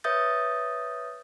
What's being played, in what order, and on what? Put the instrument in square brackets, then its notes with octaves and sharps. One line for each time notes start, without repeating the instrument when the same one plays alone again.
[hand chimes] B4 C#5 E5 D#6 G6 A6